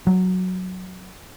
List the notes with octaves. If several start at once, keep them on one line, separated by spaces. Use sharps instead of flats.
F#3